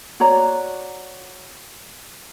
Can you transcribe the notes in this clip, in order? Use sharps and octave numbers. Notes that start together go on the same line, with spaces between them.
F#4 C#5 D5 A#5